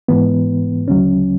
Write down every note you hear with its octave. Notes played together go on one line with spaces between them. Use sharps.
G#2 E3 B3
D2 C#3 F#3 C#4